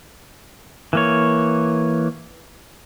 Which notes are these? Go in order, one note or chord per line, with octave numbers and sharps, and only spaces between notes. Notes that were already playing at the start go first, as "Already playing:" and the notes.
E3 A#3 C#5